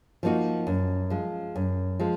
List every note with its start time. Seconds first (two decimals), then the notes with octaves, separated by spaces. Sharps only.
0.23 F3 A#3 D#4 F#4
0.67 F#2
1.10 F3 G#3
1.55 F#2
1.99 F3 G#3